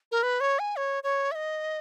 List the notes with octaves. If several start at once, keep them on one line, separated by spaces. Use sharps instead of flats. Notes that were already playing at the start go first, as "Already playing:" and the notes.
A#4
B4
C#5
G#5
C#5
C#5
E5
D#5